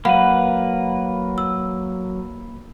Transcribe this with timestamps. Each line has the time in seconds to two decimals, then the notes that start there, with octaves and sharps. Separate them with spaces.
0.05 F#3 A#3 B4 F5 F#5 B5
1.38 E6